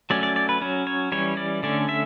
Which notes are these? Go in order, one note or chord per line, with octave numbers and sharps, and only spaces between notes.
F#3 A3 C#4 D5
D5
D5
B4
F#3 C#4
C#5
E3 G3 C#4 C#5
D5
D3 A3 C#4 D5
E5